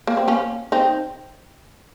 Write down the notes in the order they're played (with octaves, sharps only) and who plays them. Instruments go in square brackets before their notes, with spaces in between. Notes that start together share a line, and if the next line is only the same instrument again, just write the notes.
[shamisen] A#3
C4
A#3 C#4
C4 D#4